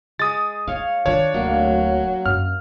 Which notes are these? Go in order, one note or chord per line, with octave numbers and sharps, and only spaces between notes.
G#3 D#6 A6
D#4 C#5 F5
D#3 D4 F4 C#5
D1 F#3 A#3
F#2 F6